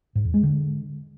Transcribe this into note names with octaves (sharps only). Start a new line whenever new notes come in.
G#2
E2
G#3
D3